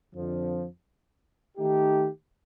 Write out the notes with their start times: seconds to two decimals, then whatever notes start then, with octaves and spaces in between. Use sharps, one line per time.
0.15 F2 D3 F3
1.58 D#3 A3 D#4 G4